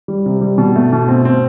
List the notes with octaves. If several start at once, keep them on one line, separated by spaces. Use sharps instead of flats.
G3
C3
G3
B2
A3
B2
C4
C4